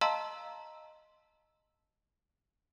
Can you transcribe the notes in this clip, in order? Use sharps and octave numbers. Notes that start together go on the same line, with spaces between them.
D#5 F5 A5 A#5 C6 E6